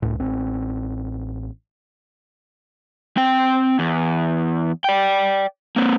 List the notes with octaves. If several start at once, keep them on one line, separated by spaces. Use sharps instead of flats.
C#2 A2
A1 C4
C4 G5
E2
D5 G5
A#3 C4